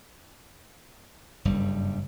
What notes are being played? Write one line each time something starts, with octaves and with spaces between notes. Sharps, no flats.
F#1 G2 G3